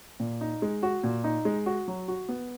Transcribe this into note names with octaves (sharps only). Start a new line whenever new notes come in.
A#2
D#4
G#3
F#4
A#2
D#4
G#3
F#4
F#3
F#4
B3